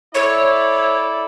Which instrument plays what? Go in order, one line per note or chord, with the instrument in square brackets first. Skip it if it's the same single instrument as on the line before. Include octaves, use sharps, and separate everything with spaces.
[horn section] E4 A4 D5 [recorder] C#5